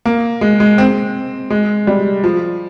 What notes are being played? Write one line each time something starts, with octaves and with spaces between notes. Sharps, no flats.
A#3
G#3
G#3
C4
G#3
G3
F3